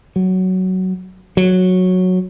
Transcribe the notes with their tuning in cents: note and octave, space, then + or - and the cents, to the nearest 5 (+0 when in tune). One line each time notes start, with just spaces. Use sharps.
F#3 +10
F#3 -10